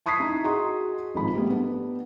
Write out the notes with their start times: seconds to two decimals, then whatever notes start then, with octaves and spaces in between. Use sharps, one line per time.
0.06 A5 C#6 D#6 G#6 B6 C7
0.20 D#4 E4
0.44 F#4 G#4 D#5 A#5 C6 D#6
1.14 G#1 G#2 F3 B5
1.35 G3 A3 B3
1.50 B3 D4